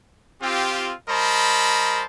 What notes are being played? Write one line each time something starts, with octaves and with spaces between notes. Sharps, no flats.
C4 F4 G4
G3 A#4 C5 D#5 A5 B5